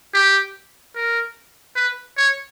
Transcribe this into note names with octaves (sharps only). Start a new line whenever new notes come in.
G4
A#4
B4
C#5